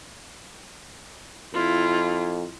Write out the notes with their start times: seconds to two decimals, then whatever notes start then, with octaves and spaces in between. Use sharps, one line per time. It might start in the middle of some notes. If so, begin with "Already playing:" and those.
1.54 F2 E4 F4